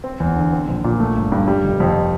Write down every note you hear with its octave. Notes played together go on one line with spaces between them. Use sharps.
C4
E2
D3
C4
A#1
A#2
A3
G1
G2
G3
F1
F2